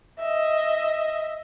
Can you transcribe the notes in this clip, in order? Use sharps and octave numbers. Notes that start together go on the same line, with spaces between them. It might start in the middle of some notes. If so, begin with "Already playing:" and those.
D#5 E5